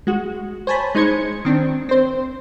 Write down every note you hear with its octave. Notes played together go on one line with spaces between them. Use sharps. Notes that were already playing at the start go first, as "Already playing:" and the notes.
G#3 F#4
C5 C#5 G#5 A5 B5
G#3 D#4 C5 G#6 C#7
D#3 C4 D4
C4 C5